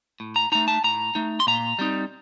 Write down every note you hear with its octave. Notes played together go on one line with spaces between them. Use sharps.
A2
A#5
A3 D#4 A#5
A5
A2 A#5
A3 D#4
C6
A#2 A#5
G3 C4 D#4